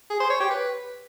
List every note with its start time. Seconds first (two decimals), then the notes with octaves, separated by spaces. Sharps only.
0.10 G#4
0.20 C5
0.30 C#5
0.40 G4
0.51 B4